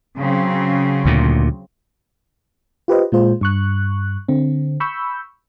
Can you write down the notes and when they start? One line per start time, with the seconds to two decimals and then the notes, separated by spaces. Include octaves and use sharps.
0.18 C#3 F#3 C4
1.05 D2 A#2
2.88 F4 G4 B4 C5 D#5
3.12 A#2 G#3 F4 C5
3.41 G2 C#6 F#6
4.28 D3 C4
4.80 B5 C#6 E6 G6